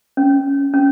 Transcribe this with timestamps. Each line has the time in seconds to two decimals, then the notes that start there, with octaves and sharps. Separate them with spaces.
0.17 C#4
0.74 C#4